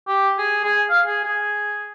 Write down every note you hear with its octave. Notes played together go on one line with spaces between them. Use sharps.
G4
G#4
G#4
F5
G#4
G#4